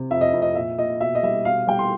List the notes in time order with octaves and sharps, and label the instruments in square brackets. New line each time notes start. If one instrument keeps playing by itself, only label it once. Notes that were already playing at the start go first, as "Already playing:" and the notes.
Already playing: [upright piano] C3
F2 E5
D#5
F2
D#5
A#2 E5
A#2 D#5
B2 E5
D#5
G3 E5
B2 F5
G3 G5
C6